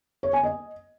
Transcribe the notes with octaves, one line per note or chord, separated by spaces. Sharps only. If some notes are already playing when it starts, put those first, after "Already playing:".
C#5
G#5
D#5